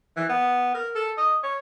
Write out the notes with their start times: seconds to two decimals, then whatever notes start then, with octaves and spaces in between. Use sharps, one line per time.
0.16 E3
0.29 B3
0.74 A#4
0.95 A4
1.17 D#5
1.43 C#5